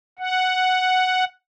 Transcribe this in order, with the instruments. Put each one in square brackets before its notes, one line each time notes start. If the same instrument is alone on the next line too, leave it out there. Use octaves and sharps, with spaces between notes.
[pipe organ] F#5